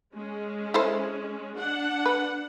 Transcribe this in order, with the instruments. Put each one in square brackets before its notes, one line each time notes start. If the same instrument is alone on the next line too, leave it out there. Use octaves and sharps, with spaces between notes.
[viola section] G#3 C#4
[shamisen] E4 A4 C5
[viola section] D4 F#5
[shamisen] B4